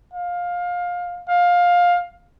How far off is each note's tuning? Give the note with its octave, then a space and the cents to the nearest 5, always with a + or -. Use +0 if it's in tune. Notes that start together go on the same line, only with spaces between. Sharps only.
F5 +20
F5 +15